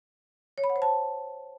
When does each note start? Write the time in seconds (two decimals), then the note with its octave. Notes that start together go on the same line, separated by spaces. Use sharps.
0.58 C#5
0.64 B5
0.70 F#5
0.76 C5
0.82 A5